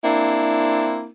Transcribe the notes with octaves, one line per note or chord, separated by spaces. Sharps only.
A#3 C4 D4 E4